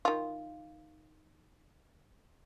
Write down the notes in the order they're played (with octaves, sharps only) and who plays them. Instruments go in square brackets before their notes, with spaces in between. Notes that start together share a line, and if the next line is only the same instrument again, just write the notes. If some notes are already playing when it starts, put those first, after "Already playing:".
[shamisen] D#3 F4